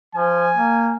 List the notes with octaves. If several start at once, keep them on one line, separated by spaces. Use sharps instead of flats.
F3 G#5
A#3